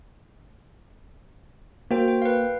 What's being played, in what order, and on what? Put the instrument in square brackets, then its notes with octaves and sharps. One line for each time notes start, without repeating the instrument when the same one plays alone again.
[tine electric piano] A#3 [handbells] F#4 C5 G5
[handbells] G5
B4 F5